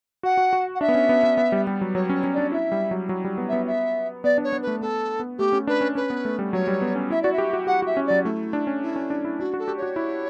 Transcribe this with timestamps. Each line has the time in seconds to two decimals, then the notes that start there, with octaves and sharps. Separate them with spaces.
0.23 F#4 F#5
0.37 F#4
0.53 F#4
0.75 F#5
0.81 D4 E5
0.88 B3
0.95 C#4
1.09 B3
1.23 B3
1.37 B3
1.52 G3
1.67 G3
1.81 F#3
1.95 F#3 C#5
2.10 C#4 C#5
2.24 C#4
2.33 D4 D5
2.52 E4 E5
2.72 G3
2.91 F#3
3.09 F#3
3.25 G3
3.38 B3
3.48 B3 E5
3.67 E5
4.24 B3 D5
4.38 D4
4.43 C#5
4.53 B3
4.62 B4
4.67 A3
4.81 B3 A4
5.20 B3
5.38 A3 G4
5.53 C#4
5.67 D4 B4
5.81 C#4
5.95 C#4 B4
6.10 B3
6.25 A3
6.39 G3
6.53 F#3 C#5
6.67 G3
6.82 B3
6.96 C#4
7.10 E4 E5
7.22 F#4 D5
7.32 E5
7.38 G4
7.53 F#4
7.67 G4 F#5
7.82 F#4 E5
7.97 C#4
8.06 F#3 D5
8.24 A3 E4
8.53 D4
8.67 C#4
8.82 E4
8.96 C#4
9.10 D4
9.25 E4
9.39 D4 F#4
9.54 F#4
9.59 A4
9.68 G4
9.77 C#5
9.82 F#4
9.96 E4